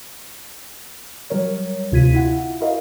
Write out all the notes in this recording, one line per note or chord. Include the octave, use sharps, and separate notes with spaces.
F#3 G3 A#4 C#5
D2 C3 F4 G#6 B6 D#7
E4 F4 F#5
E4 F#4 A#4 D#5 F5